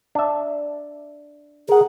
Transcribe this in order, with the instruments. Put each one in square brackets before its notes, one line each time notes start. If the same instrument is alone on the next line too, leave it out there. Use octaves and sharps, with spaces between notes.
[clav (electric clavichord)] D4 E5
[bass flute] G#4 [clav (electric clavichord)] A#4 F#5